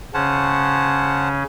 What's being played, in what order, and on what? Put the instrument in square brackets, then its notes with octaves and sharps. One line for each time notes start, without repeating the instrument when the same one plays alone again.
[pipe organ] C#3 C#4 [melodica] C5 F#5 A5